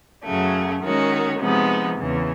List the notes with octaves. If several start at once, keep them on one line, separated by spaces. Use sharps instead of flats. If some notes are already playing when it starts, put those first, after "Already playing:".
F#2 C#3 F#3 A3
D#3 G#3 C#4 F#4
C3 F3 G#3 B3 D#4
E2 C#3 E3